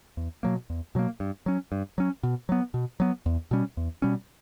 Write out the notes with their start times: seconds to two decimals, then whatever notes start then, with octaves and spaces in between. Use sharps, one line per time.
0.17 E2
0.43 B2 F#3 A#3
0.70 E2
0.95 B2 F#3 A#3
1.20 G2
1.46 F#3 C#4
1.72 G2
1.98 F#3 C#4
2.23 B2
2.49 F#3 B3
2.74 B2
3.00 F#3 B3
3.26 E2
3.51 B2 G3 C#4
3.77 E2
4.02 B2 G3 C#4